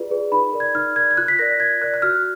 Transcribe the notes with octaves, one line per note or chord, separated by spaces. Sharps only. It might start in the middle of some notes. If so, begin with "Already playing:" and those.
Already playing: F4 G#4 B4 D5
G#4 B4 D5
D#4 B5
A#4 D5
G#6
D#4 F6
A#4 D5 G#6
G#6
F4 F#6
B6
A#4 D5 A#6
F4 G#6
A#4 D5 F#6
F#6
F#4 F6